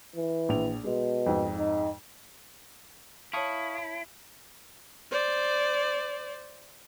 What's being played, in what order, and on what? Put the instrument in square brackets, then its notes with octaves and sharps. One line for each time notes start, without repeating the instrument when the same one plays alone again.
[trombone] E3
[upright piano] A#1 F7
[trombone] B2 [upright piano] G#3
[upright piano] F2 G#2
[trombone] D#4
[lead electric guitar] E4 [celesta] C#5 A5 [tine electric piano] F5 C#6 D#6
[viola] C5 D5